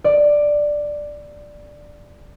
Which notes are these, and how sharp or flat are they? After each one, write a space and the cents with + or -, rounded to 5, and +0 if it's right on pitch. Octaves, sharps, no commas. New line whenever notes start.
D5 +5